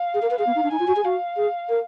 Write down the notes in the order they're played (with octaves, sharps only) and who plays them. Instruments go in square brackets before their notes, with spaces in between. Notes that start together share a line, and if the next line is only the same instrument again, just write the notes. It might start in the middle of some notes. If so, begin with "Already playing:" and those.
Already playing: [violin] F5
[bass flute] G#4
A#4
B4
[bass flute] G#4 [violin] F5
[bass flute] B3
D#4
D4
[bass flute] D#4 [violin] G#5
[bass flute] F4
F#4
G#4
[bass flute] F#4 [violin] F5
[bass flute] G#4
A#4